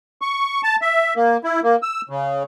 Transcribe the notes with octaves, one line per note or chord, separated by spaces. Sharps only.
C#6
A5
E5
A#3
E4
A#3
E6
C#3